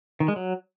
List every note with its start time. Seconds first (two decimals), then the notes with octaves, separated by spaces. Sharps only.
0.20 D#3
0.28 G#3
0.36 F#3